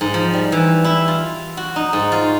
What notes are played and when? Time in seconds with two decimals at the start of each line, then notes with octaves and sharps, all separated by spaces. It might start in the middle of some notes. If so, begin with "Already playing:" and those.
0.01 G#2
0.14 F3
0.33 G3
0.52 E3
0.84 E4
1.08 F4
1.57 F#4
1.76 D#4
1.93 G#2
2.12 F4